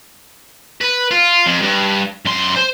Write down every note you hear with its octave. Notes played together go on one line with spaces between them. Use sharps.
B4
F4
F2
G2
F#2 C6
C5